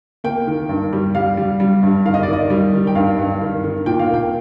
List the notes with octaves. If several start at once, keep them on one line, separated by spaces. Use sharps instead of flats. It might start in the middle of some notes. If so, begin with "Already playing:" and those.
A#3 G5
D#3
G2
G3
G3 F5
G3
G3
G2
D#3 F5
D#5
D5
D#3
D#5
G3
D#3
G5
G2 F5
G2
D#3
D#3
A#2 G5
F5
A#3 G5